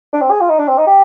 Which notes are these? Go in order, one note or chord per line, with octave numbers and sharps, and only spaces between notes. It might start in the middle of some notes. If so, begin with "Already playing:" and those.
D4
C4
G#4
F4
D#4
D4
C4
D#4
G4